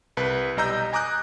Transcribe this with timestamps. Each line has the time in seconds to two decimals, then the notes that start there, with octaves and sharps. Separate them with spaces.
0.17 C2 B4 A5
0.57 B1 G3 D#5 A#5 E6 G6
0.93 G#5 A#5 D6 D#6 F#6 G6